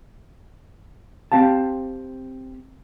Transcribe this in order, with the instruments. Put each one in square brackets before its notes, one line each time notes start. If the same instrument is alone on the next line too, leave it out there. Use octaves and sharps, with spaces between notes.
[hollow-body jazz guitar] C4 G4 F5 A5